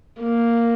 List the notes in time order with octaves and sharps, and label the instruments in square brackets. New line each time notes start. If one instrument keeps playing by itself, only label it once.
[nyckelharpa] A#3